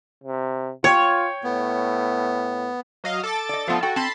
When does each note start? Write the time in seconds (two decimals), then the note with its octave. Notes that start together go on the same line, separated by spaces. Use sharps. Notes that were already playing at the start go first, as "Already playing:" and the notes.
0.24 C3
0.84 F4 C#5 G5 G#6 C#7
1.44 A2 B3
3.04 F#3 D#5 F5
3.23 A4 D6 A6
3.49 D5 D#5
3.68 F3 A3 B3 F4 A4
3.83 F#4 A4 G5
3.96 C4 A5 B5 C6